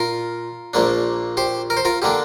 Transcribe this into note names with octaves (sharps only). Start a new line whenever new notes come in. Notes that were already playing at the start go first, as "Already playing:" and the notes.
Already playing: A#2 F4 A#4
A#1 A#2 A#3 D4
G4 C5
A#4
C5
F4 A#4
D3 A#3 D4 G4